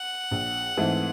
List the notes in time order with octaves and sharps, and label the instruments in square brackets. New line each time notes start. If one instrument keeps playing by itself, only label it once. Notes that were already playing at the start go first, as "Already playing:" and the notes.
Already playing: [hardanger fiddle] F#5
[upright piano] A#1
G#2 E3 A3 C4